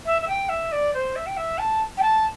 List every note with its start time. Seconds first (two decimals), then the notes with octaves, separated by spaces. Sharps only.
0.06 E5
0.22 E5
0.28 G5
0.49 E5
0.72 D5
0.94 C5
1.16 E5
1.26 G5
1.37 E5
1.58 A5
1.97 G5
2.02 A5